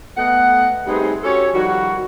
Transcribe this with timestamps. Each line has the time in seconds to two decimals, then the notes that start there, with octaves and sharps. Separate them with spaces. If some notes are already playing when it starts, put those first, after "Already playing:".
0.16 A3 B3 D#5 F#5
0.86 G3 A3 C4 D#4 G#4 B4
1.23 C#4 F#4 G4 A4 C#5
1.53 D#3 F3 G3 F#4